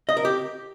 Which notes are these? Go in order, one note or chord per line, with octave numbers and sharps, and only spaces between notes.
D#5
A#4
G4